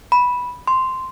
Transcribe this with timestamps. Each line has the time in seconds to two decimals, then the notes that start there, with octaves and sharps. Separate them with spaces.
0.12 B5
0.68 C6